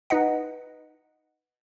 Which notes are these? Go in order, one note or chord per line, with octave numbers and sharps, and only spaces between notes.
D#4 B4 D#5 F#5